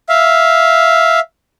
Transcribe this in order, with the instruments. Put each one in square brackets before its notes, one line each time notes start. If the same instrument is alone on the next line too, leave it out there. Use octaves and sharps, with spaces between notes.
[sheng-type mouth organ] E5 F5